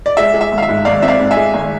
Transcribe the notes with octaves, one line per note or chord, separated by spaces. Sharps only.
D5
G#3 E5
G#3
E5
G#1
F5
E5
G#2
G#1 D5 F5
C4 E5
D5 F5
G#2
E5 G#5
G#3
G#1